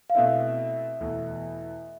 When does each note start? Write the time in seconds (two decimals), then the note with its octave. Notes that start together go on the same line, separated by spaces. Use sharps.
0.10 F5
0.15 B2 A3 C4 E4 E5
1.01 E2 B2 A3 E4